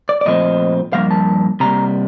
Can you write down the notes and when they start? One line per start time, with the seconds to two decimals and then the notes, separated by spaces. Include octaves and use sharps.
0.09 D5
0.21 D5
0.26 A#2 F3 A3 C4 D#5
0.93 G2 F3 A#3 F5
1.11 A5
1.60 C3 G3 A#3 A#5